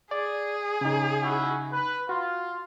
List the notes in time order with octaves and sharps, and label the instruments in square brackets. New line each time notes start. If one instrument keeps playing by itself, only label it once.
[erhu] G#4 [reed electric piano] D5
[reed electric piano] C#3 D#4
[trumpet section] C#4 E4 F#4
B4
[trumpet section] F4 [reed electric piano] F#4